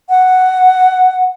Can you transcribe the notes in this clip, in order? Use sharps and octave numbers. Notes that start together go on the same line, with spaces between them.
F#5